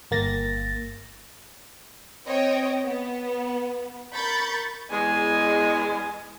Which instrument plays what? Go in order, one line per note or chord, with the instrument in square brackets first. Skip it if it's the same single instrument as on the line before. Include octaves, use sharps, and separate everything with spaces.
[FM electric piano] G1 A#3 A6 A#6
[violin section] C4 C#5 D#5 G5
B3
A#4 B5 C#6 G6 A6
[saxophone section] E2 G#3 [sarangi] G#5